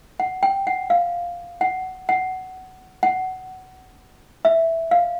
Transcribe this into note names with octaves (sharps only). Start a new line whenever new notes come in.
F#5
G5
F#5
F5
F#5
F#5
F#5
E5
F5